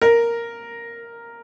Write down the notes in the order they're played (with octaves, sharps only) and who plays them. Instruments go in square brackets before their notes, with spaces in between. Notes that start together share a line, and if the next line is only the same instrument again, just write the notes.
[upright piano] A#4